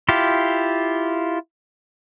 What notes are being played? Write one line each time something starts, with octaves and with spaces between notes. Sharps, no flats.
E4 F4 G4